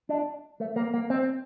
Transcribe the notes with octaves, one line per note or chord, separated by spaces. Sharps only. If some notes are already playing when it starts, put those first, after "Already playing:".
D4
A3
A#3
A#3
C4